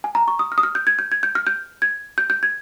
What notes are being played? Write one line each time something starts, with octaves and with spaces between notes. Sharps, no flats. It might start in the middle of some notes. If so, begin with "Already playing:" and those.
G#5
A#5
C#6
D#6
F6
D#6
F6
G6
G#6
G6
G#6
G6
F6
G6
G#6
G6
G6
G#6